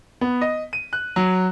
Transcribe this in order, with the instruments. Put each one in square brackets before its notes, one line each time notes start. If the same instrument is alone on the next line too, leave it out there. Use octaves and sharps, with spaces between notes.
[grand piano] B3
D#5
D#7
F#6
F#3